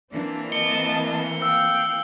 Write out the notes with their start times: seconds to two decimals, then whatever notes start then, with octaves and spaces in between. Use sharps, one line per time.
0.12 E3 A#3 C4 D4
0.52 D#5 A5 C#7 G7
1.42 F5 G5 E6